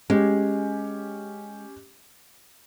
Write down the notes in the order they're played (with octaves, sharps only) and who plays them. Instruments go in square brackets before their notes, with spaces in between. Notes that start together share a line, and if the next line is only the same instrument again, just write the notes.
[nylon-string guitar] G#3 [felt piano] C#4 G4